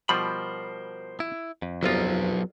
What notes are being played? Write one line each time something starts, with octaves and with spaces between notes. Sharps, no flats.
B2 F3 G3 A#4 C5 B5
E4
F2
G1 C2 F#3 B3 F4